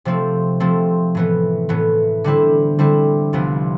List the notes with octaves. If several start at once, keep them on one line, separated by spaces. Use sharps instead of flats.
C3 F3 A3 C4
C3 F3 A3 C4
A2 E3 B3
A2 E3 B3
D3 G3 C4 E4
D3 G3 C4 E4
C2 C3 F3 B3